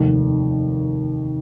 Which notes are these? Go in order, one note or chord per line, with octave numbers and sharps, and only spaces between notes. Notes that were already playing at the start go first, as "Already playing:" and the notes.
Already playing: F1 D#2 D#3